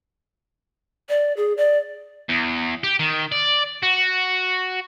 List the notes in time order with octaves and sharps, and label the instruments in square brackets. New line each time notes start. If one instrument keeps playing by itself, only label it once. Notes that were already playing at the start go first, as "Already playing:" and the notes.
[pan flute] D5
G#4
D5
[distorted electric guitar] E2
G4
D#3
D5
F#4